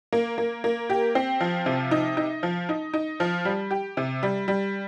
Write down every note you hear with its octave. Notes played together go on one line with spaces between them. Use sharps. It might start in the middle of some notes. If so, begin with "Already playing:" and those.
A#3
A#3
A#3
G4
C4
F3
C3
D#4
D#4
F3
D#4
D#4
F3
G3
G4
C3
G3
G3